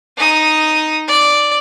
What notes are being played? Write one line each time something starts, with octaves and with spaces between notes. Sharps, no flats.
D#4 D#6
D5